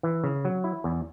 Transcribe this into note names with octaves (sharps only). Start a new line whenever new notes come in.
E3
C#3
F#3
E4
E2